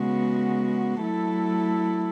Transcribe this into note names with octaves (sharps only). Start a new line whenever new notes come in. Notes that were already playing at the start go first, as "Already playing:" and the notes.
Already playing: C#3 G#3 B3 F#4
F#3 A3 E4 A4